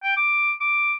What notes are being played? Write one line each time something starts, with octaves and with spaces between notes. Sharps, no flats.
G5
D6
D6